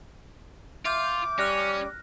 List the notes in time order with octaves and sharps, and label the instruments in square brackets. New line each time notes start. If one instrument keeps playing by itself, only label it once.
[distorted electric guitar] F4 [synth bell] E5 F6 G6 [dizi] D6
[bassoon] G3 [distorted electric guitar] C#4 [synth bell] F6 F#6 A#6